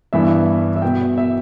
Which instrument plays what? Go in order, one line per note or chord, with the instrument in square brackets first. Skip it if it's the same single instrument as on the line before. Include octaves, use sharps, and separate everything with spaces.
[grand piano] G2 E3 B3 E5
E5
B2 B3 G5
E5